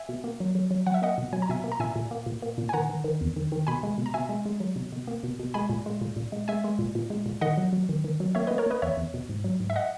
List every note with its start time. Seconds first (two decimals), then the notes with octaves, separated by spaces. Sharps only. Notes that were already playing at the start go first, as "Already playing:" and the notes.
Already playing: E5 G#5
0.09 B2
0.24 A#3
0.40 F#3
0.55 F#3
0.71 F#3
0.87 F#3 F#5
0.94 E5
1.02 A#3 D#5 F#5
1.18 B2
1.33 F#3 G#5
1.42 A#5
1.49 B2 E5 G#5
1.64 A#3
1.72 A#5
1.80 A#2 E5 G#5
1.96 A#2
2.11 A#3
2.26 A#2
2.42 A#3
2.58 A#2
2.69 G#5
2.73 D#3 F#5 A#5
2.89 D#3
3.04 D#3
3.21 E2
3.36 D#3
3.52 D#3
3.67 B2 G#5 B5
3.83 G#3
3.98 B2
4.06 A#5
4.14 B2 E5 G#5
4.29 G#3
4.45 G#3
4.60 F#3
4.76 B2
4.92 B2
5.07 A#3
5.23 B2
5.39 B2
5.54 G#3 G#5 B5
5.69 A#2
5.86 G#3
6.01 A#2
6.17 A#2
6.32 G#3
6.48 G#3 E5 G#5
6.64 G#3
6.79 A#2
6.95 A#2
7.10 G#3
7.26 A#2
7.41 D#3 D#5 F#5
7.57 F#3
7.73 F#3
7.89 D#3
8.04 D#3
8.20 F#3
8.35 A#3 C#5 E5
8.47 A#3 B4 D#5
8.58 A#4 C#5
8.66 A#3 B4 D#5
8.82 E2 C#5 E5
8.97 E2
9.14 B2
9.29 G#2
9.44 F#3
9.60 G#2
9.70 E5
9.76 D#5 F#5